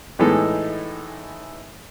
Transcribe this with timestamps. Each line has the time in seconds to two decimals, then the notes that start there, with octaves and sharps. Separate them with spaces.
0.19 A2 E3 G#3 D#4 A4